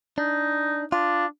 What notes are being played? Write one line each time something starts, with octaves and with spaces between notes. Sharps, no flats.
D4 D#4
D4 F4